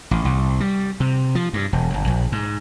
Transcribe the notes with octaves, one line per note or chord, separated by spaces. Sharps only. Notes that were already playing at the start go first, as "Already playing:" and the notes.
A1
C2
G3
C3
F3
G2
E1
G1
A#1
G#2